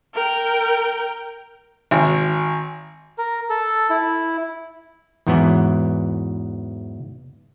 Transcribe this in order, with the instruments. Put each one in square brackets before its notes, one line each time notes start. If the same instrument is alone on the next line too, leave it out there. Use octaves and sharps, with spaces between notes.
[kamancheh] A#4 G5
[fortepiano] G#1
[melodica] A#4
A4
E4
[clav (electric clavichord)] E2 G#2 E3 F#3 B3